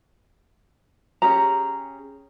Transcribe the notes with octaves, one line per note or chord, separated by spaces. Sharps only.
C#4 G4 G#4 A#5